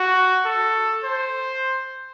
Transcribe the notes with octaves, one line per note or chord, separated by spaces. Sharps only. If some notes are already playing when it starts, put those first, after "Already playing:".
Already playing: F#4
A4
C5